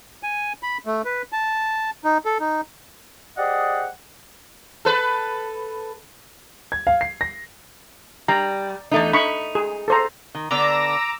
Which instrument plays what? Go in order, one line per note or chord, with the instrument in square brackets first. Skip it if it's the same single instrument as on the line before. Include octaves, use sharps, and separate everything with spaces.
[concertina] G#5
B5
A3
B4
A5
D#4
A4
D#4
[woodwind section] G4 G#4 C5 D5 D#5 F#5
[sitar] A4 B4
[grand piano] G#6
F5
C7
A#6
[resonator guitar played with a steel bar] G3 [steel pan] A#5
[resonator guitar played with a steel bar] E2 A3 D#4
[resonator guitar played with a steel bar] D#4 [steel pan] B5 C#6
[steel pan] G#4
A4 C5 A#5
[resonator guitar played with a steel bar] D#3
[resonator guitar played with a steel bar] D3 B3 D4 [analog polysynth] A#5 D6 E6